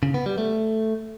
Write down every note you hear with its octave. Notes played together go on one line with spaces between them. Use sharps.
C#3
B3
G3
A3